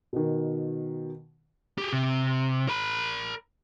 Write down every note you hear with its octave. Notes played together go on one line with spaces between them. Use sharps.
B2 D#3
G4 G#4
C3
A#4 B5